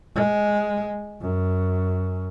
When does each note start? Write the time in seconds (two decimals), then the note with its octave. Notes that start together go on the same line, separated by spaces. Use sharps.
0.16 G#3
1.21 F#2